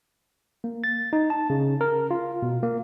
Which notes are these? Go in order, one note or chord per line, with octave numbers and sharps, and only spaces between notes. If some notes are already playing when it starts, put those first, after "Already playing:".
A#3
A6
D#4
A5
C#3
A#4
F4
B2
A#3